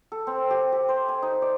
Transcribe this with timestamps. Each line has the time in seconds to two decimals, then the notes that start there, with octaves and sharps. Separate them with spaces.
0.12 A4
0.27 C4
0.50 G4
0.72 G4
0.89 C5
1.08 G#5
1.22 D#4
1.42 D5